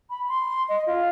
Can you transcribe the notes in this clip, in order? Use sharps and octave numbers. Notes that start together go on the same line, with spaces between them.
B5
C6
D#5
F4